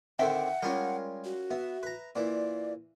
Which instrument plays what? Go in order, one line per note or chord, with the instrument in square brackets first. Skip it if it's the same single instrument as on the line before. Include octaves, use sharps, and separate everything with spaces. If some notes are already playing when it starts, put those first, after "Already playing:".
[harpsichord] D3 D#3 C4 [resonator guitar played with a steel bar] E5 G5 [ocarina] F#5
[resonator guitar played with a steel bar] G3 G#3 [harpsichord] C#4 F4 A#4
[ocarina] F#4
[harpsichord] B3 [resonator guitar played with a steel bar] E5
[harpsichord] B4 A#5
[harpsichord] A#2 E3 [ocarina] D5